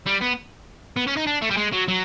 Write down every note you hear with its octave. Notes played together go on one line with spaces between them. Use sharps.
G3
B3
B3
C#4
D#4
D4
A3
G3
G#3
F#3
F#3